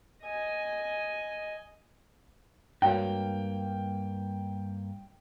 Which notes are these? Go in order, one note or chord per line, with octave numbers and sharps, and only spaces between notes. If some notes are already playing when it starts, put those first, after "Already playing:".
D#5 G#5
G2 G#3 A#3 F#4 C#5 G5